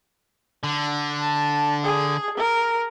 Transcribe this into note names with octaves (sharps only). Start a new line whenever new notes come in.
D3
A5
G#4
A#4